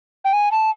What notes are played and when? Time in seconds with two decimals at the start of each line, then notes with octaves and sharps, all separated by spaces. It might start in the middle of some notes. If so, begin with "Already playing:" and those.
0.25 G5
0.33 G#5
0.51 A5